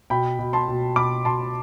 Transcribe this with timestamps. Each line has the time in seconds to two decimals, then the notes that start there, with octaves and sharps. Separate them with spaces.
0.10 B2 G5 B5
0.39 B2
0.53 A5 C6
0.68 B2
0.96 B2 B5 D6
1.25 B2 A5 C6